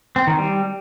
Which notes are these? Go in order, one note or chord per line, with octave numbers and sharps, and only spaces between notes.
C4
D#3
G3